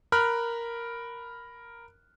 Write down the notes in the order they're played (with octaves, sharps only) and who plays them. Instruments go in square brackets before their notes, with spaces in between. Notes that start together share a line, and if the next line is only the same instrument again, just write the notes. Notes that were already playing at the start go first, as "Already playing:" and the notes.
[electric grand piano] A#4 B5 F6 F#6